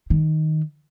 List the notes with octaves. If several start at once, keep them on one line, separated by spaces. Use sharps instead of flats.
D#3